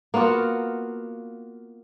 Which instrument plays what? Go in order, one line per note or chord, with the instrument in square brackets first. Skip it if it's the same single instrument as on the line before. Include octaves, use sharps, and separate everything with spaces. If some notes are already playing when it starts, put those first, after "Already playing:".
[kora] A#3 B3 F4 F#4